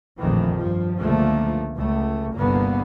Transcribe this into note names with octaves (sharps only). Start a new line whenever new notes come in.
A#1 F2 A2 D#3 E3
G2 F3
C#2 D3 F3 A3 A#3
C#2 A3
G1 C2 D3 A#3 B3